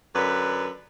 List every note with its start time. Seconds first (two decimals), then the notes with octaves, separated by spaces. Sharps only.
0.15 F#2 D3 B4